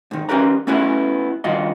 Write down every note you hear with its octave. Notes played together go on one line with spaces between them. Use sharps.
G#2 D#3
C#4 D#4 G4 A#4 B4 A#5
A3 B3 C#4 E4 F#4 B4
C#2 G2 D#3 F4 F#4 D#5